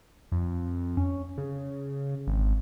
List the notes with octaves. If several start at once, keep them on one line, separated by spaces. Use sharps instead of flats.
F2
C#4
C#3
G#1